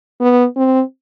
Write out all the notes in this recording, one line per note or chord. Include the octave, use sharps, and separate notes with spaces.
B3
C4